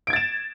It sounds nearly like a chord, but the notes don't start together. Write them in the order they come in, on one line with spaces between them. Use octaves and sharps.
D7 G#6 A6 E7